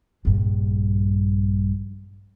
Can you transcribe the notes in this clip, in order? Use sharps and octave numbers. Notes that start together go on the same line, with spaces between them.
A#1 G2